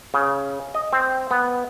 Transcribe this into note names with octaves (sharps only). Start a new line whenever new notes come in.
C#3
D#5
C4
B3